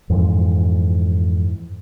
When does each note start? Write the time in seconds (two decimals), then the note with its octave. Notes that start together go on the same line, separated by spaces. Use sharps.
0.10 F2 G#2 E3